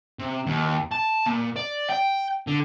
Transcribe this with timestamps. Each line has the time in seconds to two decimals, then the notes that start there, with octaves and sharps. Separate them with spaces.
0.20 C3
0.46 D#2
0.91 A5
1.26 A#2
1.56 D5
1.90 G5
2.47 D3